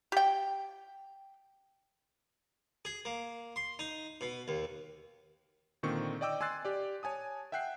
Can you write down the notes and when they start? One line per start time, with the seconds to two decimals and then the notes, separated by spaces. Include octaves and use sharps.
0.12 G4 G5
2.85 G#4
3.05 A#3
3.56 C6
3.79 D#4
4.21 B2
4.48 D#2
5.83 A#2 D3 D#3 C4 C#6
6.21 D5 D#5 G5 D6 E6
6.41 G#5 C6 E6 F#6 A6 C7
6.65 G4 D5
7.03 C#5 G#5 A5 D#6
7.52 E5 F#5 G5 F#6 C7